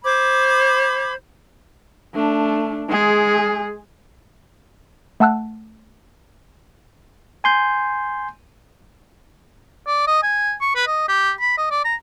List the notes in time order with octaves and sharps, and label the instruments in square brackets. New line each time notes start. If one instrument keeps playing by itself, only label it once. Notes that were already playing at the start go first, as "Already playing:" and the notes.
[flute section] C5 B5 D6 G#6
[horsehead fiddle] A3 D4
G#3 G#4
[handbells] A3 F#5 A5 E6 F#6
[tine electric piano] G#5 C6 G6
[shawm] D5
D#5
G#5
C#6
B4
D#5
G4
B5
D#5
D5
A#5